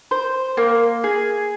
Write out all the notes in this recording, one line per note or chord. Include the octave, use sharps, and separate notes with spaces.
C5
A#3
G#4